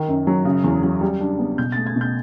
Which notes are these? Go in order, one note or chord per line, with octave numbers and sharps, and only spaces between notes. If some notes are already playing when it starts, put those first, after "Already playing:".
Already playing: D#3
F#2
F#3
C#3
E2
F#3
G3
D4
B3
B2 G6
A3 A6
G#6
B2
G6